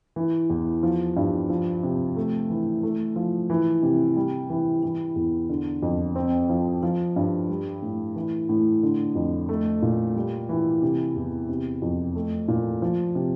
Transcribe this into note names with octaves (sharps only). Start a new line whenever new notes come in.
E3
E2
F3
G2
F3
C3
A3
E3
A3
F3
E3
C3
G3
E3
E3
E2
D3
F2
C4
F3
F3
G2
G3
A2
E3
A2
D3
F2
A3
A#2
G3
E3
C3
E2
C3
F2
A3
A#2
F3
C3